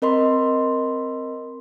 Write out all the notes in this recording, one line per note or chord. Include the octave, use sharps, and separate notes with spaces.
C4 A#4 D#5 B5 C6